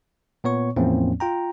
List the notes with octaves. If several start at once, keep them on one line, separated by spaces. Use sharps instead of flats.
A#2 B3 C#5 C#6
E2 A2 F3 A#3 C4 C#4
F4 G5 A#5